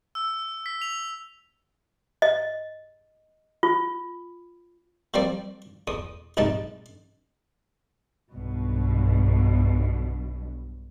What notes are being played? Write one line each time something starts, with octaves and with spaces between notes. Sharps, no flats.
E6
B6
F7
D#5
F4
F3 G3 A#3 C4 D5
E2 D#6
A#1 G#2 C3 D#4 A5
B1 G2 B2